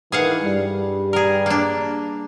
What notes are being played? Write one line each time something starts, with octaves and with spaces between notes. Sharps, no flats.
D#3 E3 G#4 F5 F#5
G2 G3
G#4 A#4
A#3 D4